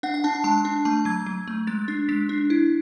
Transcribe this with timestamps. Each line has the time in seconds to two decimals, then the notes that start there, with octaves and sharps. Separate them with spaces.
0.03 D4 F#5
0.14 F#5
0.24 D4 A5
0.34 A5
0.44 G#3 A5
0.65 D4
0.85 A3 A5
1.05 F#3 G#6
1.26 F#3
1.48 A3
1.67 G#3 A6
1.88 D4 A6
2.08 G#3 B6
2.29 D4
2.50 E4